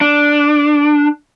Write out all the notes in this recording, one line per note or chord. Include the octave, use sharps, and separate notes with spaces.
D4